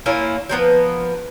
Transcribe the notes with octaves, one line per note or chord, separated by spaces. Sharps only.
A#3 C#4 E4 F4
F3 A#3 B3 B4